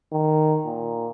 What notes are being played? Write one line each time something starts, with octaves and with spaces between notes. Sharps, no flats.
D#3
A#2